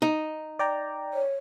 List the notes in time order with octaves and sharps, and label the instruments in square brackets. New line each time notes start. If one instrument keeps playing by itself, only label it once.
[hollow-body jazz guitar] D#4
[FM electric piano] D5 G5 A#5
[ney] C#5